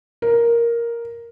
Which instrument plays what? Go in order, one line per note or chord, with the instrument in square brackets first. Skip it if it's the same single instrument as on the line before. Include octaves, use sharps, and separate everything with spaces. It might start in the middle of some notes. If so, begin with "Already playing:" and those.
[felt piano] A#4